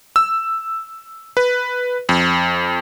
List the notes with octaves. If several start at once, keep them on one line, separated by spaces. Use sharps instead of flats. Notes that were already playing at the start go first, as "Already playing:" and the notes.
E6
B4
F2